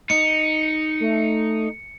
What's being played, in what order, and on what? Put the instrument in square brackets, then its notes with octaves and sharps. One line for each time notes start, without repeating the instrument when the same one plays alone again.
[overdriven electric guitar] D#4 [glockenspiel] C#7
[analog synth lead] A3